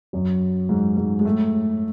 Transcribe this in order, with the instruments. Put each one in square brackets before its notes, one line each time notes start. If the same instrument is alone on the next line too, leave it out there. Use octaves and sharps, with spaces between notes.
[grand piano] F#2 F#3
G#2 G#3
G#2 G#3
G#3
A2 A3